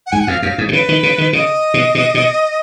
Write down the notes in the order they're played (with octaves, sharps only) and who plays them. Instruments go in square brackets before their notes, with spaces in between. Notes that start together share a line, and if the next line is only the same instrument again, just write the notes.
[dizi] F#5
[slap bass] G#2 [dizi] G#5
[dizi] F#5
[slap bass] F2 [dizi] F5
[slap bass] F#2 [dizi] F5
[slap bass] G#2
B2
[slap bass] C#3 [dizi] B4
[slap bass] D#3
C#3
D#3
[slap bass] C#3 [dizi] D#5
[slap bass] B2
B2
B2